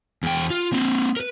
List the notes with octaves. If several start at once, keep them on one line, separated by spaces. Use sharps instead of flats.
E2 G5
F4
A#3 C4
A#4 B4